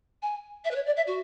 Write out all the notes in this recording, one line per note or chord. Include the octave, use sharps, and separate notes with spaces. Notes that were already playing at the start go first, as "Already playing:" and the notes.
G#5
E5
B4
C#5
D5
E5
F#4